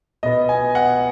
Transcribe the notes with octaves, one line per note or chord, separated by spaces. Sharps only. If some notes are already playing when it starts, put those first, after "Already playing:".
B2 B3 D#5
G#5
F#5